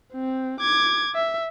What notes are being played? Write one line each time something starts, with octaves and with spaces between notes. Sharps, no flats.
C4
D6 G#6
E5